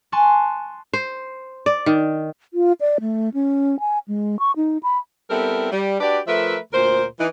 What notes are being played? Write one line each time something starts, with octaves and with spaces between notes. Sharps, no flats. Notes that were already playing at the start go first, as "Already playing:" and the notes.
G#5 A5 C6 C#6 F#6
C5
D5
D#3
F4
D5
A3
C#4
G#5
G#3
C#6
D#4
B5
G3 B3 C4 E4 A4 A#4
G3
D4 F#4 G4 B4 D5
F3 A3 A#4 B4 E5
D2 A#2 A#4 C5
E3 D#4